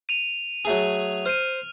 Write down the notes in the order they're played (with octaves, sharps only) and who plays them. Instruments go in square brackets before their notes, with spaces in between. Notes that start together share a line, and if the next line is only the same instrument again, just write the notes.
[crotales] D#7 F7
[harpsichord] F#3 A3 G#4
[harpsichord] C5 [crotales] F6 D#7